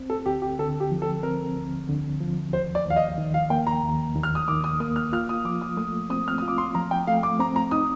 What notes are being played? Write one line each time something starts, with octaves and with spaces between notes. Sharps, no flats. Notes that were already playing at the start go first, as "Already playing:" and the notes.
Already playing: C4
A4
D2 G4
G4
D3 A4
G4
F3
A4
C4 A#4
D2
D3
F3
D#2 C5
D5
D#2 F5
D#5
D#3
F5
A#3 G5
A#5
D#2
D#2
F6
D#6
D#3 D6
D#6
A#3 D#6
F6
F4 F6
D#6
F3 D6
D#6
A3 D#6
C4 D#6
F6
F4 D#6
D6
C6
F3 A#5
G5
A3 F5
D6
C4 A#5
A#5
D#4 D#6